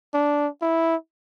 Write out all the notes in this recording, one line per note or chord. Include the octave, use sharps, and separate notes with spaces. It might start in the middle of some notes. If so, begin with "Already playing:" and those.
D4
E4